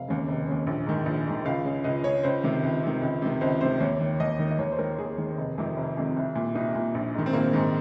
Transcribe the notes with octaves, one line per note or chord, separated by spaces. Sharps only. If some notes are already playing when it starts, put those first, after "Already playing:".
Already playing: F1 F5
D#2 C#3
F1
D#2 C#3
A#1
G#2 D#3
A#1
G#2 D#3
C#2 F5
C#3
C#2 D#5
C#3 C#5
C#2 C5
C3 D#3
C#2
C3 D#3
C#2
C3 D#3
C#2 C5
C3 D#3 C5
D#2 C#5
D#3
D#2 D#5
D#3
D#5
D#2 C#5
C5
D#3 A#4
D#2 G#4
D#3
F1
F2 C3 D#3
F1
F2 C3 D#3
C2
A#2
C2 D#4
A#2
A#1
G#2 D#3
C4
A#1 A#3
G#2 D#3